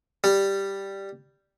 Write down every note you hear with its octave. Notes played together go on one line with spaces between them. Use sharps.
G3